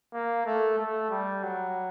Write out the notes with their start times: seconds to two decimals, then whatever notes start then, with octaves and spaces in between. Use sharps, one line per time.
0.14 A#3
0.46 A3
0.79 A3
1.10 G3
1.43 F#3